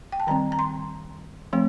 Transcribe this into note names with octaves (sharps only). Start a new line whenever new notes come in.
G5
A5
D#3 G3 C4 A#5
A#5
C6
F3 A3 C4